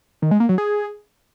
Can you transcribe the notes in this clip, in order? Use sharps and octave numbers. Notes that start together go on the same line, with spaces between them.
D#3
G#3
A#3
F#3
G#4